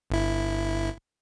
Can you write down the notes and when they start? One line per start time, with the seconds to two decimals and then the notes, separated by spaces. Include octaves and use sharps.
0.10 G1 E4